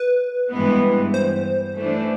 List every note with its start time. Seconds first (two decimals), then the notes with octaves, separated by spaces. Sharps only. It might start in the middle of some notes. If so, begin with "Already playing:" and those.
Already playing: B4
0.51 G2 E3 G#3 B3
1.14 C5
1.75 E3 A3 D4